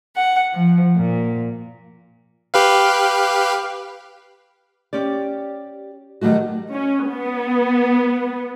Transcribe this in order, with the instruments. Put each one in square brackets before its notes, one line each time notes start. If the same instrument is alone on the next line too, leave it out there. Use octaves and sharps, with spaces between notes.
[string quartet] F#5
F3
A#2
[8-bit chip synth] G4 B4 F5
[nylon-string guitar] C#4 G4 D5
D#3 F#3 G3 A3 F#4
[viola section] C#4
B3